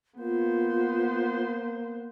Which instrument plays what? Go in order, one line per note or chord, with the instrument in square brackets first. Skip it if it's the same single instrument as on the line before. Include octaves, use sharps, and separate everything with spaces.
[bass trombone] A#3 [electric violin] B3 C5 [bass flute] F4